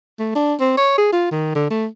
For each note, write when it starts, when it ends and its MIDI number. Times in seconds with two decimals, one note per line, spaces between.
0.19 0.35 57
0.35 0.54 62
0.60 0.75 60
0.77 0.95 73
0.98 1.08 68
1.12 1.27 65
1.31 1.54 51
1.55 1.67 50
1.70 1.87 57